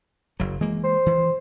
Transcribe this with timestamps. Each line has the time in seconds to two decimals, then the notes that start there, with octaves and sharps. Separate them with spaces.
0.40 F#1 F#3
0.60 E3 G#3 A#3
0.84 C5
1.06 E3